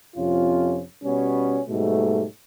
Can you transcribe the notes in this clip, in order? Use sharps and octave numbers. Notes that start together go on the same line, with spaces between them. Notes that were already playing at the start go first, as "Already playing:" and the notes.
F2 C3 F3 C#4 F4
B2 G3 B3 C#4
G#2 B2 G3 A3